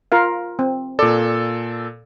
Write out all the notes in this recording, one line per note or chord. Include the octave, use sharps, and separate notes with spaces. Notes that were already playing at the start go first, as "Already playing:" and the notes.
F4 A#4 F5
C4
A#2 A4 D5